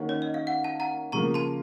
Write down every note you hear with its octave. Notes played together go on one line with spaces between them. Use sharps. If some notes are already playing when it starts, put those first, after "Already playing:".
Already playing: D#3 A#3 C#4 F#4
C#5
D#5
F5
F#5
F5 A5
F#5 A#5
C#3 F3 A#3 A#5 C#6
A5 C6